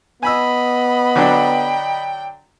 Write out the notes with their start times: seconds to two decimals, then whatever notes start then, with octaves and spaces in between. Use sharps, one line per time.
0.23 B3 D#5 G#5 B5 E6
1.16 D3 F#3 D4 G5